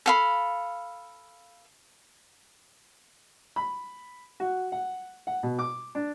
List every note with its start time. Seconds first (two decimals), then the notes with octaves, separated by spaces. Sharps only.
0.06 A4 F5 B5
3.56 B5
4.40 F#4
4.72 F#5
5.27 F#5
5.43 B2
5.59 D6
5.95 D4